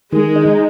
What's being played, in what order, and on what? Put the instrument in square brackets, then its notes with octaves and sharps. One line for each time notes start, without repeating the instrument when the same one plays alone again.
[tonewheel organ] D#3 [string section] G#3
[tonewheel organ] D#4